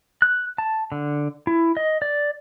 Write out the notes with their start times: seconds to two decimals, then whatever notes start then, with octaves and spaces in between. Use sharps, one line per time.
0.22 F#6
0.58 A5
0.92 D3
1.47 E4
1.77 D#5
2.02 D5